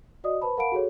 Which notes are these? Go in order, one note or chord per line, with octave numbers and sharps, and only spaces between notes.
F#4 D5 D#5 D#6
B4 C5 A5 B5
A#4 F5 F#5 A5 B5 D7
F#4 G#4 A4 C#5